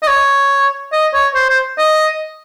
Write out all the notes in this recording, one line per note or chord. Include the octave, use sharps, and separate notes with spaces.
D#5
C#5
D#5
C#5
C5
C5
D#5